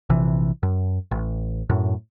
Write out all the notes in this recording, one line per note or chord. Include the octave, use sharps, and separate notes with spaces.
A#1 C3 E3
F#2
A1
F#2 A2